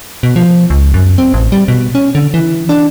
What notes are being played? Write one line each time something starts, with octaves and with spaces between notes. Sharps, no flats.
B2
F3
C#2
F#2
C4
A1
G3
B2
C#4
D3
E3
D4